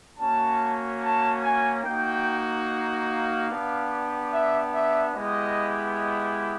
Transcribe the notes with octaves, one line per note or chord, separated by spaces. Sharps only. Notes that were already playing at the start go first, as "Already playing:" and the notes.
A#3 C#4 F#4 A5
A5
G#5
A#3 D#4 F#4 G5
F5
B3 D4 G4
E5
E5
G#3 B3 E4 G4 D#5
D#5